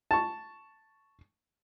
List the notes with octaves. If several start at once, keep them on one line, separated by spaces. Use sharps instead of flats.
A5 C#6